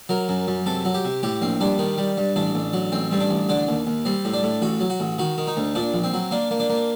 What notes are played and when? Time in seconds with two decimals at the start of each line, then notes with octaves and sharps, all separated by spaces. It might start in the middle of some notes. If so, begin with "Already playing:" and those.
0.09 F#3 A#4
0.29 F#2
0.47 F#2
0.66 C3 A4
0.85 F#3
0.94 G4
1.05 C3
1.23 A2 G4
1.42 A#1 C4
1.61 G3 D4
1.79 D#3
1.98 G3
2.17 G2
2.36 A1 D4
2.55 A1
2.73 F#3
2.92 A1 C4
3.11 G2 C4
3.20 D4
3.30 A1
3.49 D3 D4
3.68 D#2
3.87 D#2
4.05 G3 C4
4.25 A2
4.33 D4
4.43 A2
4.62 A1 F#4
4.80 F#3
4.90 F#4
5.00 A1
5.19 D#3 F#4
5.38 D#3
5.47 D#4
5.57 D2
5.75 A#2 D4
5.94 A#1
6.04 C4
6.14 F#3
6.31 A#3 D4
6.51 A#3
6.60 D4
6.70 A#3